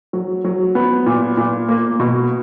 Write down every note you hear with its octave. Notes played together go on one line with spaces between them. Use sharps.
F#3
F#3
B3
A#2
A#2
A#3
B2